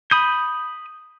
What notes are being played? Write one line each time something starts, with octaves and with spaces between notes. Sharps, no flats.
B5 D#6 G6